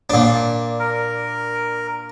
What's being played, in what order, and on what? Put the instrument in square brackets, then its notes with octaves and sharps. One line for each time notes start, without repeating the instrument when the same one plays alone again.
[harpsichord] A#2 D4
[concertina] A#4